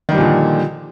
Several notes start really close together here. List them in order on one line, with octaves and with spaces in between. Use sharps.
D#3 G3 F3 A#2 D3